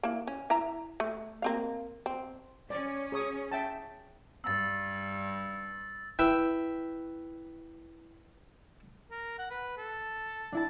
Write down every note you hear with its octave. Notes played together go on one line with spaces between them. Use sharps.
A#3 E4
C#4
E4 E5 A#5
A3
A#3 C4 F5
C4
C#4 D5
G#4 C#5 D#6
E5 G5 A5
G2 E6 A6
E4 B4 E5 G5
A#4
F#5
B4
A4
D4 E4 A5